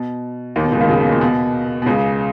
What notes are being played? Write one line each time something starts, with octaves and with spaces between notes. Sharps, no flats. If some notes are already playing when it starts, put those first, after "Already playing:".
Already playing: B2
D#2 D#3
B2
C#2 C#3
D#2 D#3
C#2 C#3
B2
A#2
B2
B2
C#2 C#3